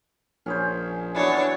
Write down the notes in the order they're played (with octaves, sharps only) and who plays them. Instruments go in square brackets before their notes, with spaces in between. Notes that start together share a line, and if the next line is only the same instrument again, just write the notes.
[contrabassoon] A#1 [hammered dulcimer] C#4 G#4 C5
[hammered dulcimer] E3 F#3 B3 [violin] D4 C#5